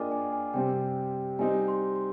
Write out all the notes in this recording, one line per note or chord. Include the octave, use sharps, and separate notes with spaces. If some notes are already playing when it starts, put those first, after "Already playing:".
Already playing: A#3 D4 F4 G#4 D#5 G5 G#5 D6
G#5
G#5
C3 G3 C4 G5
G3 C4 D#4 G#5
C6
C6